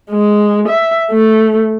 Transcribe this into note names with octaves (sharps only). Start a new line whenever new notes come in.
G#3
E5
A3